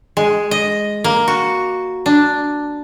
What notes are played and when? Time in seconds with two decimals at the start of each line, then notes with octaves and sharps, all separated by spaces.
0.17 G#3
0.51 D#5
1.04 A#3
1.28 F#4
2.06 D4